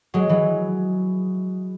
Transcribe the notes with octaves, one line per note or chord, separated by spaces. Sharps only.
F#3 G#3
E3 F#3